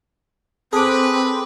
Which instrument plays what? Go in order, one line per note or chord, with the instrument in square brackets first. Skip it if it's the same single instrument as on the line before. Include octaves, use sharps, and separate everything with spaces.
[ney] C4 [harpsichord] G#4 [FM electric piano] A4 D6 [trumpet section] B4